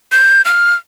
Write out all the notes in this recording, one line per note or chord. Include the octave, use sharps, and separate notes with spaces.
G6
F6